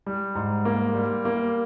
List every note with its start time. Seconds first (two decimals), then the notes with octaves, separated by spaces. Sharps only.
0.06 G3
0.35 G#2
0.65 A#3
0.94 G3
1.25 A#3